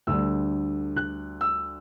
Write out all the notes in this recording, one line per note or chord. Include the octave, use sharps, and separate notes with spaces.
D2 D3 G3 E6
F#6
E6